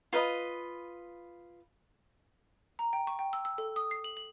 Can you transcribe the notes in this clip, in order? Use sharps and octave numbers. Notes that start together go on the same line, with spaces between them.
F4 B4 D#5
A#5
G5
C#6
G5
E6
E6
A4
D#6
C7
F#7
F#7